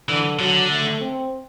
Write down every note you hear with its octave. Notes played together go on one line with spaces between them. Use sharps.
D3 E3
D3 F#3
A3
C4